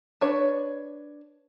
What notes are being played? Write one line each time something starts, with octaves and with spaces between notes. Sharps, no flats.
D4 B4 C#5